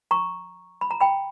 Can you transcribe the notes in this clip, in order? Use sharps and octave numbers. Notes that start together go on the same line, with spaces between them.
A#5 C#6
B5
A#5
G5 B5